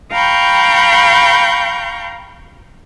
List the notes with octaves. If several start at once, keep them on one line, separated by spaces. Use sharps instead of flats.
F5 G5 A#5 B5 C#6 G6